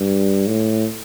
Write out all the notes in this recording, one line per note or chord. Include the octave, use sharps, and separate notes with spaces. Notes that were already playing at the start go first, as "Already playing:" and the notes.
Already playing: G2
A2